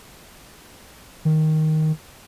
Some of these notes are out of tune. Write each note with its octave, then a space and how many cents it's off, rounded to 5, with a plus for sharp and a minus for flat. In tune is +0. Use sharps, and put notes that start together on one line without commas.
D#3 +5